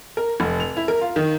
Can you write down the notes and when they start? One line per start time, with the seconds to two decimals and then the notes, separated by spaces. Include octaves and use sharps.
0.17 A#4
0.40 F1
0.60 F7
0.77 E4
0.88 A#4
1.01 F4
1.16 D#3